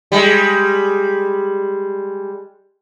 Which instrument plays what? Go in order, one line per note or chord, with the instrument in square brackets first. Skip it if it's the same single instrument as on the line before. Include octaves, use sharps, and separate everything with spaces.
[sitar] G3 G#3